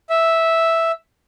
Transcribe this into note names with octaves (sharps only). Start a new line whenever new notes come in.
E5